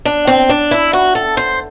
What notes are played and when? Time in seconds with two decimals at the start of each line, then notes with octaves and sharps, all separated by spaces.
0.05 D4
0.27 C4
0.49 D4
0.71 E4
0.93 F#4
1.15 A4
1.37 C5